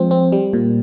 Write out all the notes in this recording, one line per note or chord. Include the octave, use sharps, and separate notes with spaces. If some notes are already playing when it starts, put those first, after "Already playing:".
Already playing: F3 G#3 C4
C4
G3
A#2